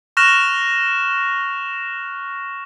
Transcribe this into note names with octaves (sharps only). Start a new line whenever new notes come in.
C#6 F6 F#6 A#6 E7 F7